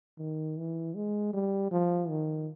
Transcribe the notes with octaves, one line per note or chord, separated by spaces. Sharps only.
D#3
E3
G#3
G3
F3
D#3